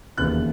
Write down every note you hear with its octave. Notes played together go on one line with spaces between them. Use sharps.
E1 D#2 C#3 E3 F#6